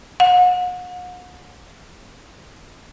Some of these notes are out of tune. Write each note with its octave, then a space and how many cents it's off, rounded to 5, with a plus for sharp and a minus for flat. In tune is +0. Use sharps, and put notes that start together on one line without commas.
F#5 -40